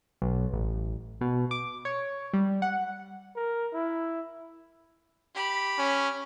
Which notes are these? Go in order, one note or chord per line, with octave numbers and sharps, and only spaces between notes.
B1
A1
B2
D6
C#5
G3
F#5
A#4
E4
G4 B5
C#4